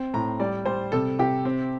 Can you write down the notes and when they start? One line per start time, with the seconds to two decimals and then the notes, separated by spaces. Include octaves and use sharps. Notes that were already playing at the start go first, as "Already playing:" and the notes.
Already playing: C4
0.14 A2 A#5
0.40 G3 D5
0.65 G3 C5
0.92 C3 A4
1.19 C3 G4
1.45 C4